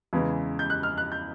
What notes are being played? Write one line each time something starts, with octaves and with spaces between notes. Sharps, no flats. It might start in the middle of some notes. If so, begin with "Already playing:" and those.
E2 C#3 E3 G#3
G6
F#6
F6
F#6
G6